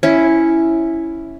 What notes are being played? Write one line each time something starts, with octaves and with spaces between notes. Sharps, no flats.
C#4 E4